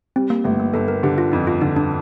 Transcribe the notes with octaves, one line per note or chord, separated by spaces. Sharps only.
G3 C4
A#3
G1 A3
A#3
G1 A4
A#4
D3 G4
F4
F2 D#4
F4
D3 D#4
D4